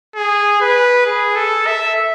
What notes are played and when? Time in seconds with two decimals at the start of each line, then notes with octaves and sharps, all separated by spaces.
0.15 G#4
0.61 B4
1.06 G#4
1.36 A4
1.66 E5